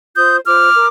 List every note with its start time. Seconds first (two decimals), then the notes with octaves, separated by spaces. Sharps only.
0.15 F4 C5 D#6 G6
0.45 F4 C5 D6 F6
0.75 A#4